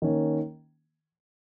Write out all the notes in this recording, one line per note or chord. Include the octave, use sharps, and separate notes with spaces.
D#3 A#3 C#4